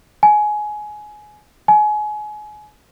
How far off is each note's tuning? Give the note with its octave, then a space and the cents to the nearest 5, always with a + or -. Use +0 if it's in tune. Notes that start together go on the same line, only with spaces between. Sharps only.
G#5 +20
G#5 +30